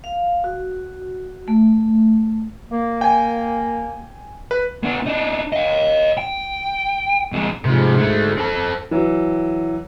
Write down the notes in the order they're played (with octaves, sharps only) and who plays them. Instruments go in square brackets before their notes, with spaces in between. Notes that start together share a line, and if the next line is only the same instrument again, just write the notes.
[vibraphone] F5
F#4
A3
[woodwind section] A#3
[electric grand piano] G5 G#5
B4
[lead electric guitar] B3 D4
D4 D#4
D#5 F5
G5
F2 G#3
[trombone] G#2 [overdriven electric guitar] C3 F3
[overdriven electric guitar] D3 A3
C4 A4
[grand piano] E3 F#3